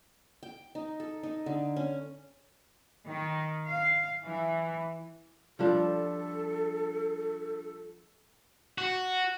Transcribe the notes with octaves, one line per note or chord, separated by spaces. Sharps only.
G5
D#4
A4
D#4
D3
C#4
D#3
F5
E3
F3 G3 D4 A4
F#4